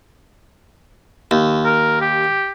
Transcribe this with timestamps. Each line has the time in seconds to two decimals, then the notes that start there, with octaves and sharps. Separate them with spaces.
1.31 D#2
1.65 A#4
2.01 G4